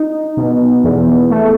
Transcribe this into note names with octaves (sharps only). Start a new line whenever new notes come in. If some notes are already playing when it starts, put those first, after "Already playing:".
Already playing: D#4
B2
E2
A3